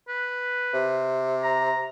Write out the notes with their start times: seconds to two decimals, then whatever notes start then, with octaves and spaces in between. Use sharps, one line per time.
0.08 B4
0.74 C3
1.43 A#5